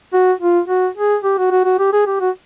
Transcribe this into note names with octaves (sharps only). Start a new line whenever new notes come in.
F#4
F4
F#4
G#4
G4
F#4
F#4
F#4
G4
G#4
G4
F#4